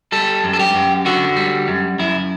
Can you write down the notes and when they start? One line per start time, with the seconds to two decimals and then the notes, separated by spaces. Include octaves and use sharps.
0.12 G3 A4
0.44 F#2
0.53 A4
0.59 G4
0.75 F#2
1.06 D3 F#4
1.36 G3
1.68 F#2
1.99 F#2 E4